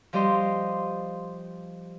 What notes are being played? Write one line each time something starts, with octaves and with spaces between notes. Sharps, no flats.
F3 G3 G4 D#5 C6